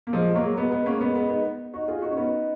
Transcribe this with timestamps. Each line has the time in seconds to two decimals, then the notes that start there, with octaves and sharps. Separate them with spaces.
0.07 A#3
0.13 F3 G#3
0.31 G#3
0.35 F#3 A#3
0.56 G#3 B3
0.71 G#3 B3
0.86 A#3 C#4
1.01 G#3 B3
1.15 G#3 B3
1.30 B3 D#4
1.74 D#4 F#4
1.88 F4 G#4
2.02 D#4 F#4
2.11 C#4
2.17 B3 D#4